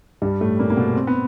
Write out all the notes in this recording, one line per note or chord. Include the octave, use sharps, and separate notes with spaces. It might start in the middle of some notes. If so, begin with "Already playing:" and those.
G2 G3
A2 A3
A#2 A#3
A#3
B2 B3
C4
B3